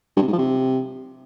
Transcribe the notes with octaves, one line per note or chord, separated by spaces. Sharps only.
G2
C3
G#2
F3
C3